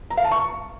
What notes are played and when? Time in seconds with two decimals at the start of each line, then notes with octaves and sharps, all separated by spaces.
0.10 A#5
0.17 F5
0.24 A5
0.31 C#6